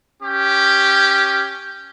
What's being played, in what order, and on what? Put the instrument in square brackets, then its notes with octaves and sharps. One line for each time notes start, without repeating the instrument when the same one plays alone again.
[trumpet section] C#4 G4